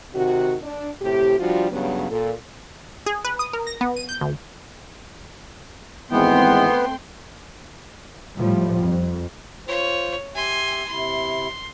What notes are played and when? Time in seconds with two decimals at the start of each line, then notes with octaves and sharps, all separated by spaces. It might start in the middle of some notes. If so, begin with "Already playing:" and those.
0.14 C3 D#3 F#4
0.62 D4
1.01 A2 C3 G4
1.40 F3 G3 D4 F4 F#4
1.71 G2 C#3 F#3 B3
2.09 A#2 A4
3.06 G#4
3.25 B4
3.39 D#6
3.53 A#4
3.67 A#6
3.81 B3
3.97 D#7
4.09 G6
4.21 D2
6.11 G#1 E3 G#3 A3 B3 C4 G5 C6
8.36 A2 F3 G3
8.81 F2
9.67 F4 C5 C#5
10.35 G4 E5 G#5 C6
10.89 C3 E4 C6